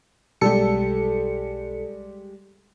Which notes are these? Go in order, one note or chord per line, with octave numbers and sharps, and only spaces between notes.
B1 G3 G#3 G4 A4 C#7